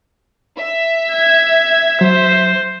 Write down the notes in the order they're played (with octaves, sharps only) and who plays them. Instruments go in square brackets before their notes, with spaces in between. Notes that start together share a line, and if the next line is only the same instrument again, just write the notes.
[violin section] E5
[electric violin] G#6
[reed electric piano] F#3 [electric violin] C5